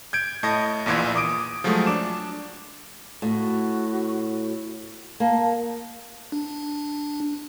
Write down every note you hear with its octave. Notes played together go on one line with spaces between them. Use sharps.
G6 G#6 D7
A2 D#5 A5 G#6 A#6
A#1 E2 A#2 E3 G#6
D6 D#6 D7
F3 F#3 G#3 A3
D4 D6 E7
A2 F#4
A#3 A5
D4